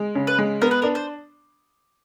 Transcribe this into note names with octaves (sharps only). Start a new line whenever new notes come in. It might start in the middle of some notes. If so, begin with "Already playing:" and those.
Already playing: G#3
C#3
B4
G#3
B3 A#4
B4
D4 A#4
C5